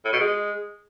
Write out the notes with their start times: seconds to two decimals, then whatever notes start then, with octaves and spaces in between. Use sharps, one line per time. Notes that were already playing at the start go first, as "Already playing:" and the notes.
0.05 A2
0.12 B2
0.20 G#3